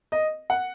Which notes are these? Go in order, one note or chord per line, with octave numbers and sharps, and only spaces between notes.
D#5
F#5